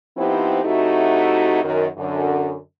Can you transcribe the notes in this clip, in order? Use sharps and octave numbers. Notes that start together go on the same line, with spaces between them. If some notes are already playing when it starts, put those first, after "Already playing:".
F3 B3 C4 D#4 E4 G4
C3 A3 D#4 E4 F#4
F#2 D#3
F#2 D3